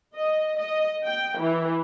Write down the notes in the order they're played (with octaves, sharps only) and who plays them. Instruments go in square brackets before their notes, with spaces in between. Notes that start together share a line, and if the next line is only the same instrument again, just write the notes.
[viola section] D#5
D#5
G5
E3